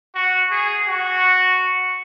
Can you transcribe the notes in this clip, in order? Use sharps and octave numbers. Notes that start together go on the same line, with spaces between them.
F#4
G#4
F#4